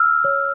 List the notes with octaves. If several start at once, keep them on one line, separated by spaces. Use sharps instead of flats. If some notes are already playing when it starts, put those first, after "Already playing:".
Already playing: E6 F6
C#5